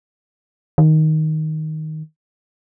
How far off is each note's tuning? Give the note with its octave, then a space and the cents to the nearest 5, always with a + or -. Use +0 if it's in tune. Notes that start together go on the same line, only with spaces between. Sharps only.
D#3 +5